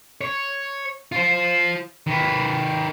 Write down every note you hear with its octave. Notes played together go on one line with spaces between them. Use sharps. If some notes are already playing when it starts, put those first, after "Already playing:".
C#5
F4 C5
D#3 B4